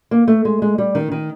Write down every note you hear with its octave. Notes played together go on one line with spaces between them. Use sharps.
A#3
A3
G#3
G#3
G3
D#3
D#3